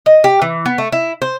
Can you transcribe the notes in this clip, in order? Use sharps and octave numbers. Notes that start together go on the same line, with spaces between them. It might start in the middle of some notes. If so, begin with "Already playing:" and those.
D#5
G4
E3
B3
A3
E4
C5